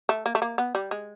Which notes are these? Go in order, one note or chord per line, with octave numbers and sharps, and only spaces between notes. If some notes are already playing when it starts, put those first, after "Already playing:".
A3
A#3
A3
A#3
B3
G3
G#3